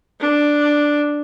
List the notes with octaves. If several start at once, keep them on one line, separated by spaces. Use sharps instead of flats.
D4